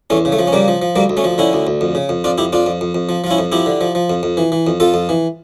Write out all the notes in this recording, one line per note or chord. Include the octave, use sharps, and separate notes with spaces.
E2 A3 C#4
C#3
A3
F3
C#4
C#3 G3 A#3
F3
F3
D2 G3 A#3
D2
A3 C#4
F3
D3 C#4 E4
D2
D2
F2
C#3
F2
F2 D4 F4
F2 E4 G4
F2 D4 F4
F2
F2
F2
F3
F3 F4
C#4 E4
F2
F3 E4 G4
D3
F3
F3
F2
F2
E3
E3
F2
F2 F4 A4
F2
E3